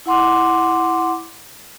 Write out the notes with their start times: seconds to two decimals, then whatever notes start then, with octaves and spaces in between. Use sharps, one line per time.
0.06 E4 F#5 C6 D6